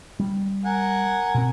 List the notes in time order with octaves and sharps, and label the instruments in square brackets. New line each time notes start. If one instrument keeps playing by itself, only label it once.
[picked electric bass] G3
[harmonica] A#4 F#5 G#5
[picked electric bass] B2 C4